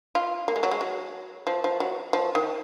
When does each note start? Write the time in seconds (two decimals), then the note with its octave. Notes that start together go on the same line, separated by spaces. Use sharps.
0.15 F4
0.48 A#3
0.56 G#3
0.63 F#3
0.71 G#3
0.81 F#3
1.47 F3
1.64 F3
1.80 F#3
2.13 F3
2.35 D#3